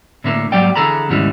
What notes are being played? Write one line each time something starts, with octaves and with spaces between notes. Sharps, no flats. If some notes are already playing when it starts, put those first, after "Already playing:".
A2 D3 A3 A#3
G#2 F#3 G3 A#3 D5 G5
D3 E3 G#4 A4 A#5 B5
D#2 G#2 C#3 E3 G3 G#3